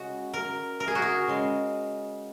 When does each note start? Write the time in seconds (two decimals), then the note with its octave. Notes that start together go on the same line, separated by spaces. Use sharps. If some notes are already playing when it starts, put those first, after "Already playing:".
Already playing: C#3 G#3 F#4
0.33 A#4
0.80 A#4
0.88 G#4
0.95 F#4
1.02 G#4
1.27 C#3 G#3